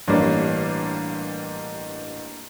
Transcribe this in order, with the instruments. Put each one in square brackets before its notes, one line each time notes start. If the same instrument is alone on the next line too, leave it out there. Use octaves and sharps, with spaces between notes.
[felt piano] A1 C#5 [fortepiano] G2 G3 A#3